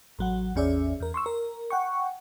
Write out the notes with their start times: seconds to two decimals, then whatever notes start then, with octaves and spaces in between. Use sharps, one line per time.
0.19 A1 F#3 F#5
0.56 A1 E2 C#4 G#4 D5 E5
1.00 E2 A#4
1.14 C6 C#6 E6
1.26 A#4
1.70 F#5 G5 C#6